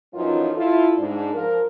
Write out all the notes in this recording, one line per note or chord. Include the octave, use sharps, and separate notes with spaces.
F#2 E3 F3 C#4 D#4 F4
E4 F4 A4
G#2 D4
F3 A#4